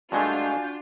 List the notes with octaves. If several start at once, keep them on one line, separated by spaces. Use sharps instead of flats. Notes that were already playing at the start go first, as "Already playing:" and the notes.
G2 G#3 A3 D4 F4 F#4 G#5 G6